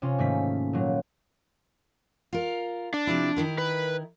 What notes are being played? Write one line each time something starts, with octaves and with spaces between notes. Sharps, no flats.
C3 C#4 F4
G#2 D#3 A3 A#3 B6
A#2 F#3
F4 A#4
D4
C3 F3 E4
D#3 E4 A#4
B4